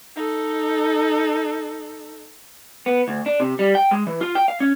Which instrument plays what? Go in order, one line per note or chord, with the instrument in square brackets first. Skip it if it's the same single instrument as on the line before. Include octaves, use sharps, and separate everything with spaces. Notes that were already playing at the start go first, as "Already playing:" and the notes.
[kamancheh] D#4 A4
[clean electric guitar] B3
D2
D4
C3
G3
G5
G#3
E3
F4
G5
F5
C#4